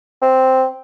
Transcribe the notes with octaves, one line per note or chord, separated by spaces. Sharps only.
C4